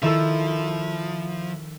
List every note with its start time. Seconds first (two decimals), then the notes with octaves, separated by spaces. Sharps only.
0.02 D#3 F3 E4 A4 E6